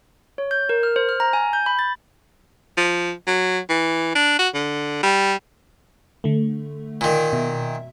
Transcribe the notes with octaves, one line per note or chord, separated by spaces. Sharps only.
C#5
G6
A#4
F6
C5
F6
A#5
G#5
G6
B5
A6
F3
F#3
E3
D4
F#4
D3
G3
D3 A3
A#2 D#3
B2 E5